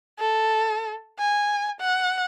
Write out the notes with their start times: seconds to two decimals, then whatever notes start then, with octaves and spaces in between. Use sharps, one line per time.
0.19 A4
1.19 G#5
1.81 F#5